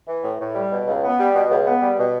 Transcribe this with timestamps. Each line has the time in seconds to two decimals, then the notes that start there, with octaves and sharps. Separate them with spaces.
0.08 E3
0.23 A2
0.40 A2
0.55 G3
0.72 B2
0.87 C#2
1.04 B3
1.19 G3
1.35 B2
1.51 C#2
1.67 B3
1.82 G3
1.98 B2